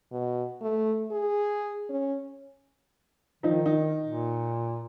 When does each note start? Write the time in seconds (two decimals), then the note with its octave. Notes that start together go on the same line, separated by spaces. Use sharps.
0.12 B2
0.62 A3
1.11 G#4
1.89 C#4
3.43 D#3 F3 D#4
3.66 D#4
4.05 A#2